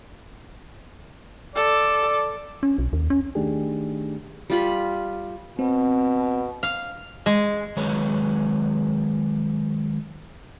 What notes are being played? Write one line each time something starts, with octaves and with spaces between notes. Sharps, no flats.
A4 D5
C#4
B1
D#2
C#4
D#3 A3 D4 D#4 G4 G#4
G3 F4 B5
B2 C4
F5
G#3
D#3 F#3 G#3 G#4 B4 C#5